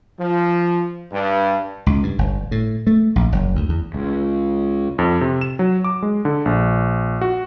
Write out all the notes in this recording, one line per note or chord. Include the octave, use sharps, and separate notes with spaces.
F3
G2
C#2
G2
G1
A2
A3
A#1
F#1
D2
E2
C#2
F2
C3
E7
F#3
D6
G#3
D3
A#1
F#4